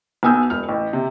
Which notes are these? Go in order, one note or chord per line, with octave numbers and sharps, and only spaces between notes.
B1 B3 G#5 D#6 E6 G6
E1 F6
A1
C3